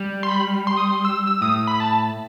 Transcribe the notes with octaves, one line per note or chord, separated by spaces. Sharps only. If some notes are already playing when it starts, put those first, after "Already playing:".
Already playing: G3
C6
B5
C6
D#6
C6
E6
E6
A2 D#6
B5
A5